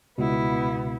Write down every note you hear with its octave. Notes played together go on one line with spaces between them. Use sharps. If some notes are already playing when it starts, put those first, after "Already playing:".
C#2 B2 B3 E4